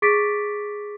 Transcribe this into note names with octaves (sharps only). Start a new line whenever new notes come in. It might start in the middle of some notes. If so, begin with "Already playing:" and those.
G#4 C#6 D6 A6 B6 D7